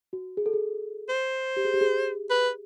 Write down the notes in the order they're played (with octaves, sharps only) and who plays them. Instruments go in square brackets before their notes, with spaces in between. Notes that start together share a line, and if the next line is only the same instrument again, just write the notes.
[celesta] F#4
G#4
A4
G#4
[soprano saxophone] C5
[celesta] G4
G#4
G4
G#4
[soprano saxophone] B4